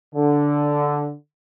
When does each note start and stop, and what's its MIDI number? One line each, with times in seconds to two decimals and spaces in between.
0.15 1.12 50